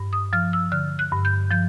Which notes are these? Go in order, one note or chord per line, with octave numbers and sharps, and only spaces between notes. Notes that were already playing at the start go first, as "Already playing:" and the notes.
Already playing: G2
D#6
F3 F6
E6
D3 F6
F#6
G2
G6
F3 G6